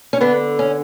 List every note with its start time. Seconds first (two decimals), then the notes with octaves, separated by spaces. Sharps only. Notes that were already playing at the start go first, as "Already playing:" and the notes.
0.13 C#4
0.21 D3 B3 D4
0.59 C#4